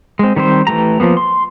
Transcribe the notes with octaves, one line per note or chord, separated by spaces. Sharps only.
G#3 C4
D#3 G3 C4 C5
E3 A3 G4 A#5
F3 G#3 A#3 B3
C6